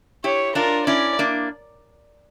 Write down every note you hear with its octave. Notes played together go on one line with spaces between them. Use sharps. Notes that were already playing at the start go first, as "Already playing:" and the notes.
E4 G4 C#5
D4 F4 A#4
C#4 E4 D5
A#3 D4